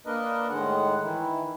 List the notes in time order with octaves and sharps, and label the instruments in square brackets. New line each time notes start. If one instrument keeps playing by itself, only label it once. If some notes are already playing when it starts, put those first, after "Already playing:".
[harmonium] A#3 D4 A#4 B4 D#5
A2 D#3 G#3 F#5
D#3 E3 E4